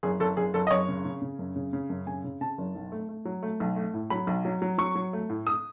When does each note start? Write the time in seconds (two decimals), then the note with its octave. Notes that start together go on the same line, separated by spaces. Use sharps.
0.03 F#1 G#4
0.20 F#1 A4
0.37 F#1 G#4
0.54 F#1 A4
0.67 D#5
0.71 F#1 C#5
0.88 C#3
1.05 C#3
1.22 C#3
1.39 F#2
1.56 C#3
1.73 C#3
1.90 F#2
2.07 C#3 G#5
2.24 C#3
2.41 C#3 A5
2.58 F#1
2.75 B1
2.92 A3
3.09 A3
3.25 F#3
3.43 A3
3.60 B1
3.76 A3
3.94 A2
4.10 F#3 B5
4.27 B1
4.45 F#3
4.62 F#3
4.78 F#3 C#6
4.95 F#3
5.13 A3
5.30 A2
5.47 D#6